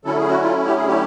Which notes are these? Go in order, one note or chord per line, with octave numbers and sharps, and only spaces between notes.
D3 F#3 A3 C#4 E4 A4
G#4
F#4
F4
G4
G#4
G4